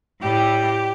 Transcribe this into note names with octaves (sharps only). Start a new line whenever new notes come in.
A2 G3 G4